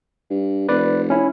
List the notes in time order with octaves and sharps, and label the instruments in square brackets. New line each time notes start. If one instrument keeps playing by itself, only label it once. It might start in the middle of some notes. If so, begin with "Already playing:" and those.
[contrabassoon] G2
[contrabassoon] F1 [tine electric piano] B4 D5
[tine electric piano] C#4 E4